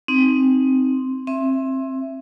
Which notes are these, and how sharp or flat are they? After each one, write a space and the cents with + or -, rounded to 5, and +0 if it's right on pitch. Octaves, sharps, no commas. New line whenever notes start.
C4 +0 D#4 +0
C4 +25 E5 +10